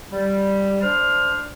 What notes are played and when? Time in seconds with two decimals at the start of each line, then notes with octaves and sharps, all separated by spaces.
0.11 G3
0.82 D4 C5 F6